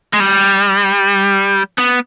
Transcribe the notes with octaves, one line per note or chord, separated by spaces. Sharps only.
G#3
G3
B3